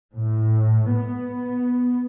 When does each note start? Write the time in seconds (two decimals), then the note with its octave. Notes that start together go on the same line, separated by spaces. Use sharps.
0.16 A2
0.92 B3